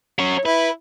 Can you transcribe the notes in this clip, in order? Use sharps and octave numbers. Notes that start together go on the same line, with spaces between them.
F#3 C#4
E4 B4